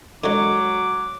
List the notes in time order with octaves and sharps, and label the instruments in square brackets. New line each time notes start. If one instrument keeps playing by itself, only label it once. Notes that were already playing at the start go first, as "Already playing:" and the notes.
[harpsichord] D3 G#3 [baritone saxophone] F#3 [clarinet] D6